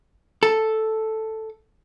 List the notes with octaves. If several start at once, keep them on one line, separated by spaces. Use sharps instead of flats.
A4